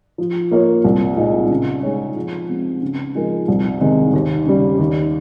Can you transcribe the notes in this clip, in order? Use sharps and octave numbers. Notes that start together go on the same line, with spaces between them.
F3
A#3 F4 A#4 C#5
C2
A#2 G#3 D#4
C#3
G#3 D#4 G#4 C#5
F3
G#3 C4
C#3
F3 G#3 D#4 A#4
C2
C3 D#3 G#3
D#2
C#3 G3
D#2